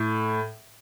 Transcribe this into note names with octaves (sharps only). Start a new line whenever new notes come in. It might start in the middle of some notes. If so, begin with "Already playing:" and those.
Already playing: A2